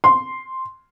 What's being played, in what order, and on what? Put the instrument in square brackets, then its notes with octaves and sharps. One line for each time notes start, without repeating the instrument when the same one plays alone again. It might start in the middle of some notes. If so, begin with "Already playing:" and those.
[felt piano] C6